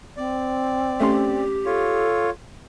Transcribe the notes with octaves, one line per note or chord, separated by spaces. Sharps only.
C4 D5
A3 C#4 G4 C6
F4 A4 C#5